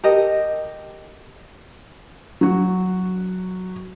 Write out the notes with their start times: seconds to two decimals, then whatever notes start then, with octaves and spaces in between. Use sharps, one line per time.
0.04 G4 A4 A#4 D#5
2.41 F#3 F#4